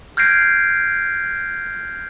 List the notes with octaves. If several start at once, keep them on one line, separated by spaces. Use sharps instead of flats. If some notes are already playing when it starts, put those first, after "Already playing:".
F6 G6 G#6 A#6 C7 D7